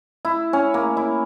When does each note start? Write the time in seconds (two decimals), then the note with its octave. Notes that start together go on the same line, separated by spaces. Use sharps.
0.25 E4
0.53 C#4
0.74 A#3
0.97 E4